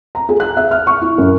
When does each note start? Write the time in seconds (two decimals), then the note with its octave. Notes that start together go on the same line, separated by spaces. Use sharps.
0.15 A#5
0.29 G#4
0.40 F#6
0.57 E5
0.71 F6
0.87 C#6
1.01 E4
1.18 F#2